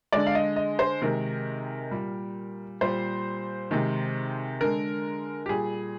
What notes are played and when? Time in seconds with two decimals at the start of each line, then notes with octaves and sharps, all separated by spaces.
0.12 D3 G#3 D5
0.26 F5
0.35 D#5
0.56 D#5
0.79 C5
1.02 C3 D#3 G#3 A#4
1.91 A#2 G3
2.81 A#2 G3 C5
3.71 C3 D#3 G#3
4.61 D3 G#3 A#4
5.46 G4
5.49 A#2 G3 G#4